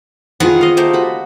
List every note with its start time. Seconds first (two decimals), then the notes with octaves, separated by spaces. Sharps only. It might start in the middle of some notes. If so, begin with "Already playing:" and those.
0.40 D#3 B3 C4 F4 G#4 F#5
0.61 D#5 F5
0.77 A3 A#3 G4 C5
0.93 F#4 B5